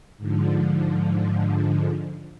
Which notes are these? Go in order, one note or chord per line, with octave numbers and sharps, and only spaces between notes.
G#2 D3 F3